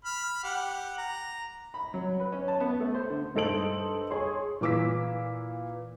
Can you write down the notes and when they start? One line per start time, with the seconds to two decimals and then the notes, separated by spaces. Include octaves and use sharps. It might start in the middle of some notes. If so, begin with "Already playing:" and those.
0.05 B5 F6
0.44 G4 F#5
0.98 A#5
1.74 B5
1.94 F#3
2.20 B4
2.32 C#4
2.48 A5
2.60 B3
2.80 A3
2.94 C5
3.10 D3
3.35 G2 D#4 A4 C5 D7 F#7
4.11 G#4 C#5 C6
4.61 A#2 E3 D6 E6 B6